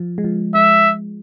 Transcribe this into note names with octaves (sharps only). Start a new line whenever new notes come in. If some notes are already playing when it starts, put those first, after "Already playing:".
Already playing: F3
G#3
F3
G#3 E5